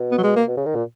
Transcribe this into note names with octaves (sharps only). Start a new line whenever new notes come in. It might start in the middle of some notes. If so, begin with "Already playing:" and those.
Already playing: B2
B3
F#3
G#3
A#3
B2
C#3
D#3
A#2